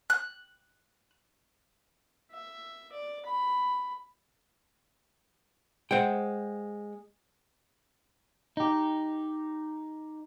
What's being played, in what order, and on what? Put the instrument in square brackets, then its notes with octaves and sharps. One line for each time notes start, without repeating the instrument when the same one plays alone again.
[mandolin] F#6
[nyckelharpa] E5
D5
B5
[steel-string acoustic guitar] G#3 [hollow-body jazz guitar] C5 F#5 G5
[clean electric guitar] D#4 G4